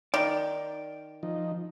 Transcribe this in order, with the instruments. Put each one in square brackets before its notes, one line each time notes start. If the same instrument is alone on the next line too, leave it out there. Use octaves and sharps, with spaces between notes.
[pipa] D#3 [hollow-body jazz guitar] D5
[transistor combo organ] F3 D#4